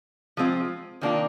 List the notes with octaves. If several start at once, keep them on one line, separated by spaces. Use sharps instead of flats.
F3 G#3 C4 F4
D#3 A#3 D4 F4 A#4